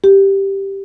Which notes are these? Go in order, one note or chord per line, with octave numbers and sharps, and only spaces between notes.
G4